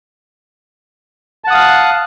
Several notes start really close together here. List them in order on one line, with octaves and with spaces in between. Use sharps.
A5 F#5 D#6 F5 F#6